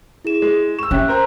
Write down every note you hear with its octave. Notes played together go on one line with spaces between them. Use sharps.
E4 G#4 E7
G#3
C#6 E6 E7
C#4 G4 E5 F#6
A#4 C5 A#5